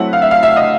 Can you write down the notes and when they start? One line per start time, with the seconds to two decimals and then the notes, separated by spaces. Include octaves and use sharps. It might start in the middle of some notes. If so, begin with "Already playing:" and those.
Already playing: F#3 A3 C4 E4 F#5
0.13 F5
0.22 E5
0.31 F5
0.43 E5
0.56 D#5